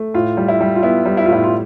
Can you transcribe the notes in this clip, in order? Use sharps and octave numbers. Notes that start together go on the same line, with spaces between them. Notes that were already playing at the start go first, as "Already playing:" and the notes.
Already playing: A3
A2 F4
G3
E4
G3
F4
B3 E4
G3
E4
F4
A2 E4
F4